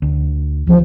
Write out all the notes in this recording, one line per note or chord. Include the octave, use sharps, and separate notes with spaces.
D2
C#2 E3 F3